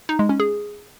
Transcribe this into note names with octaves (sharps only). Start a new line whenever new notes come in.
D#4
G#3
C#4
G#4